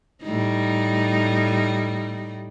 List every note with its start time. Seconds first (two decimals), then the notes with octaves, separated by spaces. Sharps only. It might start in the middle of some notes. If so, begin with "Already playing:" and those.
0.23 A2 G3 D#4